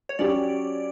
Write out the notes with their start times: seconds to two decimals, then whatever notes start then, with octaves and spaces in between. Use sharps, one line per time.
0.09 C#5
0.19 F#3 C#4 G4 D5